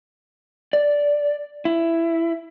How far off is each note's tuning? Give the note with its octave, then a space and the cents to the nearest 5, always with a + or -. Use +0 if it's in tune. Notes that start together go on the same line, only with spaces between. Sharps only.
D5 -5
E4 +10